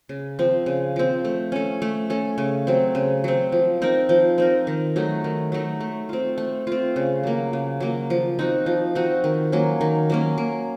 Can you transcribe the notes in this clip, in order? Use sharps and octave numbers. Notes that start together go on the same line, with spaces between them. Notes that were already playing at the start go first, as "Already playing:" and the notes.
C#3
F3 C4
C#3
F3 C4
A3
C#4 A4
A3
C#4 A4
C#3
F#3 C4
C#3
F#3 C4
F3
C4 D#4 A#4
F3
C4 D#4 A#4
D#3
F#3 A3 D#4
D#3
F#3 A3 D#4
A3
C4 F4
A3
C4 F4
C#3
F#3 A#3
C#3
F#3 A#3
F3
C4 D#4 F#4
F3
C4 D#4 F#4
D#3
F#3 A#3 C#4
D#3
F#3 A#3 C#4
A#3